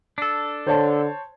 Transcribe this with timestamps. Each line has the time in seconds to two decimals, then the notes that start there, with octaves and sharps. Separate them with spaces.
0.18 D4 A4
0.67 D3 C5 C#5 A5